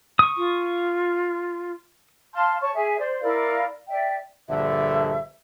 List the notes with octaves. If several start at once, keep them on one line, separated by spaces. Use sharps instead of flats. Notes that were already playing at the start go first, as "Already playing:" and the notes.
C#6 D#6
F4
F5 A5 C6 F6
C#5 A5 C#6
G#4 E5
C5 D5
E4 A#4 D5 F5
D5 E5 G5
A#1 G2 D3 E5